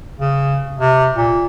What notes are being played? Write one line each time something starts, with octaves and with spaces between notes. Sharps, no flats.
C#3
C3
A#2